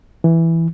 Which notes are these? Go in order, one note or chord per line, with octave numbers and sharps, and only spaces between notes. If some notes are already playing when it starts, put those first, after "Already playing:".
E3